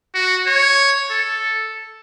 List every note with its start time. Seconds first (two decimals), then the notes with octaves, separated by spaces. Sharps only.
0.14 F#4
0.46 C#5
1.10 A4